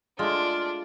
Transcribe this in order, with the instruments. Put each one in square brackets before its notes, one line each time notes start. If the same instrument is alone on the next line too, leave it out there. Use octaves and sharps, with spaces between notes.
[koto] G#3 A3 [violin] D4 [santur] F4